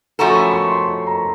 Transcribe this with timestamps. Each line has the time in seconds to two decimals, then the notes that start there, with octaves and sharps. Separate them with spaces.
0.19 F3 A3 C#4 F#4 A4 A#5
0.36 B5
0.52 C#6
0.68 C6
1.07 A#5